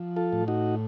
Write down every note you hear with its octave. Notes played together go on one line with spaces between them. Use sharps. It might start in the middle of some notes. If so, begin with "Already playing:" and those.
Already playing: F3
F4 A4
A2
D#4 F#4